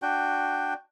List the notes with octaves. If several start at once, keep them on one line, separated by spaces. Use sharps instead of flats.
D4 F#4 G5